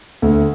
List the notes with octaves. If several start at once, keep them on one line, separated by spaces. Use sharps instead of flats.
D2